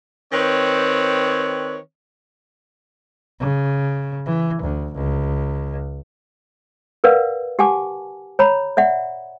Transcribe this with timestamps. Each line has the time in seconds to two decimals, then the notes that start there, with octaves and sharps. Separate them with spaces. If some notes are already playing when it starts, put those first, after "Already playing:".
0.33 D#3 C4 B4 C#5
3.40 C#3
4.26 E3
4.62 D2
4.95 C#2
7.04 A#4 B4 D5 F5 F#5
7.59 G4 F#5 G#5 A5 D6
8.39 C#5 A#5 B5
8.77 D5 E5 F#5